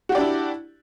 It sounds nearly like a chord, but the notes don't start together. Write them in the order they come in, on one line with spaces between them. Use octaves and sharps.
F#4 G4 D5 D4 E4